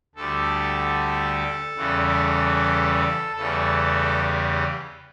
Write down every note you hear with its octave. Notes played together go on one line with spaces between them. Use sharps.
D2 D3 G3 A4
E2 C#3 E3 G3
E2 C#3 E3 G3 A4